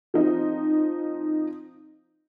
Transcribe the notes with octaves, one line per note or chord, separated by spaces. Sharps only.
F3 C4 D#4